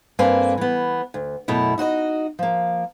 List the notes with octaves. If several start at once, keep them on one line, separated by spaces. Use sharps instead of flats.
G2 A#3 C4 A4 B4 G#5
E3 B3
D2
F#2 B2 A3 E4
D#4 F#4 C5 D#5
F3 A#3